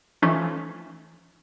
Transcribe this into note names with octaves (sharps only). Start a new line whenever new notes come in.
E3 F3 A3 C#4 D#4